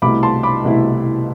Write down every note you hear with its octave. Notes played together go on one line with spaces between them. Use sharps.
C2 B2 A3 E4 B5 D6
A5 C6
B5 D6
C2 B2 A3 E4